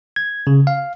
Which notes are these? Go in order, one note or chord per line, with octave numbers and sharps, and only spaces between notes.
G#6
C#3
F5